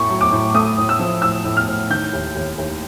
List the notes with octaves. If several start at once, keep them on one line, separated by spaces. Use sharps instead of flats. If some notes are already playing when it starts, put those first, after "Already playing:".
Already playing: A2 A3 C#6
F#3
D6
A2
A3 D#6
A2
E6
F3
A2 E6
A2
F6
A2
D#3 G6
D#2
D#2
D#2